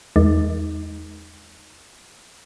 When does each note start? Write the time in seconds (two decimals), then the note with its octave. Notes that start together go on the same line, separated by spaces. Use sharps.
0.16 E2 G#3 D#4